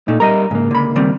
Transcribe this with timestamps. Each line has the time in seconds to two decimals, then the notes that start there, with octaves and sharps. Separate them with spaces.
0.08 A#2 A3 D#4
0.20 G3 A#4 D#5 A#5
0.51 C#2 G#2 A#3
0.71 D3 B5
0.96 D#3 G3 C4